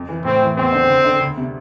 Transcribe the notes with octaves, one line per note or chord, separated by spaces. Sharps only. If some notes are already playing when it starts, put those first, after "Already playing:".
Already playing: F2
E3
A2 C4
E3
E2 C4
D3
D2
D3
D2
C3